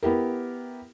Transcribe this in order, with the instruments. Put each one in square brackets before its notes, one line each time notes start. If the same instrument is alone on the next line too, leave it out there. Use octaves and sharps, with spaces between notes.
[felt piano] B3 E4 G4 A#4